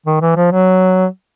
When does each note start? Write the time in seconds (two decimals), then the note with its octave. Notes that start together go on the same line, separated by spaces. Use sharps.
0.06 D#3
0.21 E3
0.36 F3
0.52 F#3